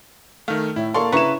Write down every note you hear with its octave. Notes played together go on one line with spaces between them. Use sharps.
D#3 A3 F5
A2 E4
A#3 A4 D5 F5 A5 C6 C#6
C#3 E4 B4 A#5 C#6 E7